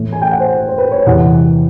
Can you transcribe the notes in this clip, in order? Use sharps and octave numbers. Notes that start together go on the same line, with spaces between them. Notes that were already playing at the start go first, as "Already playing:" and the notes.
Already playing: A2 E3
G#5
G5
F#5
C5
C5
B4
C#5
E2 C3 E3 F#5